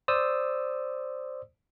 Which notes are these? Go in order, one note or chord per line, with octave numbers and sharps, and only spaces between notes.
C5 D5 D#6 E6